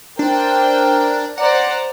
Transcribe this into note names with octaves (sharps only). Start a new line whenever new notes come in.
D4 A#4 C5 G5
C5 D5 F#5 A#5